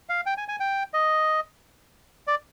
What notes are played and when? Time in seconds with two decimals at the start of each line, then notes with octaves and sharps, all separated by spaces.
0.09 F5
0.26 G5
0.38 G#5
0.48 G#5
0.60 G5
0.93 D#5
2.27 D5